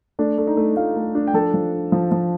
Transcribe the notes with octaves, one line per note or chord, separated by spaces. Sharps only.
A3 D4 D5
A3
D#4 D#5
A3
A3 F4 F5
A3
D4
G5
F3 A4 A5
F3
D4
F3
F3